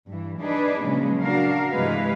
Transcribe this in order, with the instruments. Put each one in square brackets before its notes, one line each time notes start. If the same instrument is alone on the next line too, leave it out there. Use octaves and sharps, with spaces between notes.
[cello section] G2 E3
D4 D#4 G#4 B4
A#2 C#3 F3 F#3 G#3
D4 F#4 A#4 F5
G2 C3 E3 G#3 B4 F5